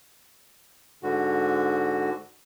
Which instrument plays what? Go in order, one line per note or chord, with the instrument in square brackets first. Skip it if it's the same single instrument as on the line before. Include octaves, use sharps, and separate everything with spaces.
[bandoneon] G#2 D3 F#4